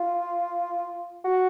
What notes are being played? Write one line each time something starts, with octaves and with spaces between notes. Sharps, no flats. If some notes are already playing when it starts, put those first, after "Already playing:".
Already playing: F4
F#4